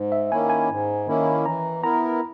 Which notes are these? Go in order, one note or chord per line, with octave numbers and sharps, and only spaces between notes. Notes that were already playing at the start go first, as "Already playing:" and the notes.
Already playing: G#2
E5
D#3 A#3 C#4 E4 G#5
G#5
G#2
D#3 A#3 C#4 E4
E3 A#5
B3 E4 A#4 A#5